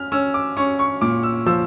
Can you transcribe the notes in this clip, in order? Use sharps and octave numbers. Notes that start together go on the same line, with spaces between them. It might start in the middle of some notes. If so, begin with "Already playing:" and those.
Already playing: C#4 F6
C#4 E6
D6
C#4 C#6
C#6
A#2 D6
E6
F3 E6